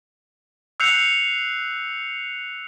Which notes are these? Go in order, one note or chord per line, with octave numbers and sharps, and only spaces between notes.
E6 F#6 G6 C7 C#7 F7